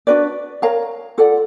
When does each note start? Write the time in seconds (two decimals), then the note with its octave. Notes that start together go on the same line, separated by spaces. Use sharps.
0.07 D4 F#4 B4 D5
0.62 A#4 C#5 F5 A#5
1.18 F4 A4 D5 F#5